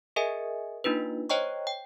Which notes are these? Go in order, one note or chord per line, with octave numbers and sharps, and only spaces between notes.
G#4 A#4 D#5 E5 G#5
A#3 D4 D#4 F4 B4
C5 C#5 D#5 G5 A#5 C#6
G5